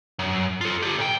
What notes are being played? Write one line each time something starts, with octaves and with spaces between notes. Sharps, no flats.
F#2
F4 A4
G4 A4
B1 G5